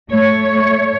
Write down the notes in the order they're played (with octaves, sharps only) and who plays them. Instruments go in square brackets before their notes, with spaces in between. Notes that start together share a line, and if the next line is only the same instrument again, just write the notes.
[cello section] A3 C#5